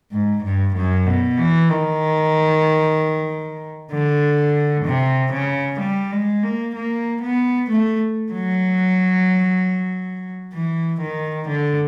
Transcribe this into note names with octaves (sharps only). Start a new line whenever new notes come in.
G#2
G2
F#2
B2
E3
D#3
D3
C3
C#3
G3
G#3
A#3
A#3
B3
A3
F#3
E3
D#3
D3